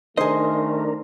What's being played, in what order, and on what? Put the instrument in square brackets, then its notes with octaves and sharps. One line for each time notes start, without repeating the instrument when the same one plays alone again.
[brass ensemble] D#3 A3 [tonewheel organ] D4 A#4 [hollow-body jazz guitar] G#4 D#5 [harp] C5